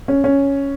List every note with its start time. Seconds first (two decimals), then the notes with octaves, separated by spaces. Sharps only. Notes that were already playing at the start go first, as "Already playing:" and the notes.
0.08 C#4
0.24 C#4